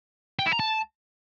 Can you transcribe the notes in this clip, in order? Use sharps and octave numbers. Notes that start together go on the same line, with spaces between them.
G5
E4
A#5
A5